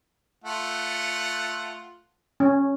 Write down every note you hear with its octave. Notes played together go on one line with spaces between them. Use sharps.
A3 F4 F#5
C#4